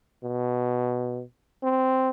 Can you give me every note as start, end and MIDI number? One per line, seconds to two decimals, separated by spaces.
0.24 1.22 47
1.63 2.10 60